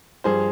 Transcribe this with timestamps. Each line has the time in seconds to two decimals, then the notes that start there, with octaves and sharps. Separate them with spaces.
0.24 G2 F3 G#4 C5